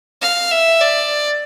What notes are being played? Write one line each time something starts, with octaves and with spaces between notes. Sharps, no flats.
F5
E5
D5